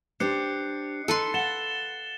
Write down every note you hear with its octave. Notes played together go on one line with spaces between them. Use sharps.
D4 G4 C5 F#6 C7 C#7
D#4 A4 B4 C6
F5 F#5 A6 E7 G7